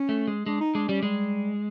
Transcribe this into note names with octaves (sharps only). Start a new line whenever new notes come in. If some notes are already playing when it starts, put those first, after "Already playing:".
Already playing: C#4
A3
G#3
G#3 D4
D#4
G#3 D4
G3 C#4
G3 G#3